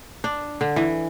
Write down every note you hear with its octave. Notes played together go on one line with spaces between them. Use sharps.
D4
D3
E3